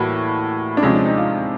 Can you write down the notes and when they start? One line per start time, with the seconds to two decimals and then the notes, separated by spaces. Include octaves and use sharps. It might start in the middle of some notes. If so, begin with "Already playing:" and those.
Already playing: A2 E3 G3 A#3 F#4
0.77 D4
0.82 C3 F3 G#3 C#4
0.94 D4
1.05 D#4
1.17 F4